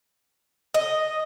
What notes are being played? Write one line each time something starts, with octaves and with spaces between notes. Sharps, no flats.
D#5